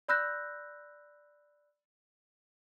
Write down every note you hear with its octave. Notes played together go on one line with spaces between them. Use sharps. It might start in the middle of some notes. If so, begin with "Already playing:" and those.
D5 B5 E6 F#6 G6 A#6